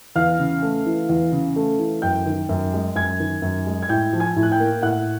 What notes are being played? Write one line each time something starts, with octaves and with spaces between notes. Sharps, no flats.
E2 F5 F6
C#3
A3
E3
E2
C#3
A3
E3
F#2 G5 G6
D#3
F#2
G#3
F#2 G#5 G#6
D#3
F#2
G#3
G#6
A2 G5 G6
F3
G#5 G#6
A2
F#6
G5 G6
A#3
A2 F#5 F#6